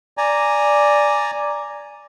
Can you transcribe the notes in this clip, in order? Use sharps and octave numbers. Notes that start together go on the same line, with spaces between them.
D5 G#5 A#5